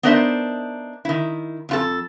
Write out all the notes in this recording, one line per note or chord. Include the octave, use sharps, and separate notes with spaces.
B3 D4 D#4 A#4 C5 E5
D#3 E4
F2 F4 A4